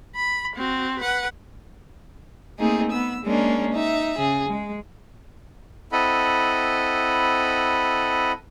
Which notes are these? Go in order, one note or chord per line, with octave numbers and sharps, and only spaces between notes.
B5
C4 F#4
B4 F#5
A3 A#3 C4 D#4 G#4
B3 E6
G#3 A#3 C#4 D4 A#4
D#4 E5
C#3 G#4
G#3
C4 E4 A4 D#5 F#5 B5